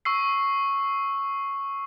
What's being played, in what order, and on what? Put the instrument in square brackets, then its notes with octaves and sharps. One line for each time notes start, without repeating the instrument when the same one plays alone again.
[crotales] C#6 E6 C7